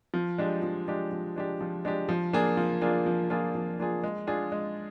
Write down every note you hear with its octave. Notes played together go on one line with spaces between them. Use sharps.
F3
G#3 D4 G4
F3
G#3 D4 G4
F3
G#3 D4 G4
F3
G#3 D4 G4
F3
A#3 D4 F4 G#4
F3
A#3 D4 F4 G#4
F3
A#3 D4 F4 G#4
F3
A#3 D4 F4 G#4
G#3
D4 F4 G#4
G#3